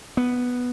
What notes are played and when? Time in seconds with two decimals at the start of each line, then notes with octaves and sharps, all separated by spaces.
0.17 B3